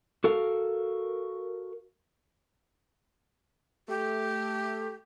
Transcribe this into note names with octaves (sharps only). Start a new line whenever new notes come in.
F#4 A4 A#4 F5
A3 G4